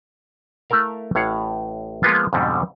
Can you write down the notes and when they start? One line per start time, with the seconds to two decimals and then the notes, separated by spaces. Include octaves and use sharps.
0.70 A3 E4 A4 A#4 F5
1.15 A1 A2 C#5 F5 F#5
2.03 F3 G#3 A#3 B3 F4
2.33 F2 G#2 B2 D3 G3